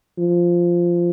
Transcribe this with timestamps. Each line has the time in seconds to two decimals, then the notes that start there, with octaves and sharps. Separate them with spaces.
0.18 F3